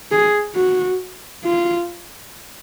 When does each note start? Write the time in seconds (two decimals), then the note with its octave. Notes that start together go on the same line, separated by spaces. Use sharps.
0.12 G#4
0.56 F#4
1.44 F4